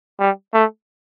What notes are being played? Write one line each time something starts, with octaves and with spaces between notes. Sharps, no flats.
G3
A3